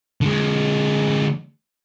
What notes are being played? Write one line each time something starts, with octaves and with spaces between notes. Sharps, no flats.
D3 G#3